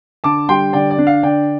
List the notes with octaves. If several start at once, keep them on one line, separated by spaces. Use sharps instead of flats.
D3 A5 D6
G3 G5 C6
D3 D5 G5
D5
D4
F5
D3 D5 G5